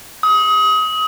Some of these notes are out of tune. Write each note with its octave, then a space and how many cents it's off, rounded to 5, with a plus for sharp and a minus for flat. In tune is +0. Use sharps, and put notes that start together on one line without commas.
D#6 +30